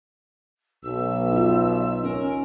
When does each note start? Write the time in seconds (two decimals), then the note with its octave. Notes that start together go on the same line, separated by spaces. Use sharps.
0.83 B1 E6
1.32 D#4 F4
2.04 C#4 A#4